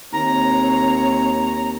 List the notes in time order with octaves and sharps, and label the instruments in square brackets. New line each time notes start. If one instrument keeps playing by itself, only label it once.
[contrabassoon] D#2 [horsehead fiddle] C4 C#5 [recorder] A#5